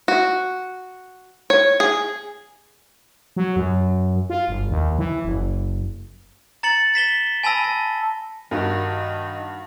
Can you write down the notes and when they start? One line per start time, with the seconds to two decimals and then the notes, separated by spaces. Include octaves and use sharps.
0.08 F#4
1.50 C#5
1.80 G#4
3.37 F#3
3.56 F#2
4.30 F4
4.48 G1
4.70 D#2
4.99 E3
5.25 F#1
6.63 A#5 A6 C#7 F#7
6.94 A6 B6 E7 G7
7.43 G#5 A5 B5 E6 A#6
7.64 A5
8.51 G2 D#3 D#4 F#4 A#4